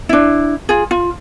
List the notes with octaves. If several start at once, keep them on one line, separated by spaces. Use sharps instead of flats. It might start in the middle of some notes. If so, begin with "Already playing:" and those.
D4 E4
F4 G#4
F4